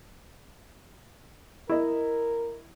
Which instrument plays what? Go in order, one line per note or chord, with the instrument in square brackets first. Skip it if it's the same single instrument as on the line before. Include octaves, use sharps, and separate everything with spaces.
[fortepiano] E4 D#5 [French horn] A#4